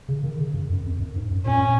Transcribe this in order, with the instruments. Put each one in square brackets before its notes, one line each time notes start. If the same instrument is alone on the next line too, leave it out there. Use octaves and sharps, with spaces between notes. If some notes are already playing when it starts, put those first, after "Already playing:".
[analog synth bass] C#3
D#3
C#3
F#2
F#2
F2
F#2
G#2
F#2
[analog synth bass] A#2 [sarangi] C#4